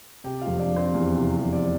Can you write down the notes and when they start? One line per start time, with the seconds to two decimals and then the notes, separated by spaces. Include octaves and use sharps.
0.24 C3 G4 G5
0.42 F4 F5
0.47 F1
0.59 D4 D5
0.71 F1
0.76 C4 C5
0.94 E2
1.17 C3
1.41 F1
1.53 D5